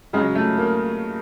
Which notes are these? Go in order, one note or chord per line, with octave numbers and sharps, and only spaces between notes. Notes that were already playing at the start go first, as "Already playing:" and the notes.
C#3 F#3 G#3
A3
A#3